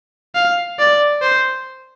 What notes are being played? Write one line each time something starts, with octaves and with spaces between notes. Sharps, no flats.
F5
D5
C5